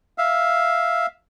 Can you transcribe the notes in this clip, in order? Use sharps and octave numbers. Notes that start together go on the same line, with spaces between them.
E5 F5